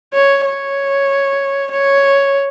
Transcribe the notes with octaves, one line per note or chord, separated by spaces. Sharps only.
C#5
C#5
C#5